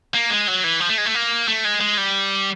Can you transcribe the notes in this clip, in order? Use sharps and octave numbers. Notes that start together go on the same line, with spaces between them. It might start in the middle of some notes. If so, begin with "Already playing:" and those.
A#3
G#3
F#3
E3
F3
A3
G#3
A3
A#3
A3
G#3
G#3
G3